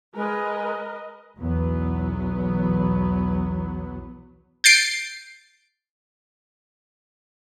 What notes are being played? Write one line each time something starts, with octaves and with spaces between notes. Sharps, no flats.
G#3 A#4 B4 D#5
B1 E2 F#3 B3
G6 A6 C7 D7